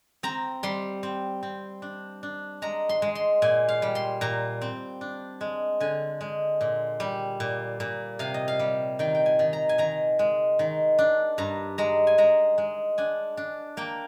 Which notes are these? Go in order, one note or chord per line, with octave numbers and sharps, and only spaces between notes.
C4 A#5
G3 C6
C4
C4
D4
D4
G#3 A#5
C6
G#3
C6
A#2 G#5
F5
G3
C6
A#2 A#5
C4
D4
G#3
D3 G#5
G#3
A#2
G3
A#2
A#2
C3 F5
D#5
F5
G3
D#3 G5
G5
G#5
D#3
A#5
G#5
D#3 A#5
G#3
D#3
D4
G2 A#5
G#3 A#5
G#5
G#3 A#5
G#3
D4 G#5
D4
A#3 G5